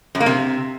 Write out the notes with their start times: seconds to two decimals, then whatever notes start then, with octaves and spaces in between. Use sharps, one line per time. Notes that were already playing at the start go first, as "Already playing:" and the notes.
0.15 F#2
0.20 A#3
0.26 C3